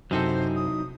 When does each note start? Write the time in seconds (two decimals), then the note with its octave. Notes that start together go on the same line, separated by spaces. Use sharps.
0.11 F#2 C3 F#3 C4 D#4 E4 A4 C5
0.56 D#6